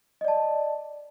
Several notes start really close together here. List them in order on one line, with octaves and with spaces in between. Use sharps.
D#5 D5 A5